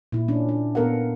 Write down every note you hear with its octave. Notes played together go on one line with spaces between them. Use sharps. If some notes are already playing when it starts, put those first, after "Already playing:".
A#2 E4
C#4 D4
D4
A#2 B3 A4 A#4 F5 F#5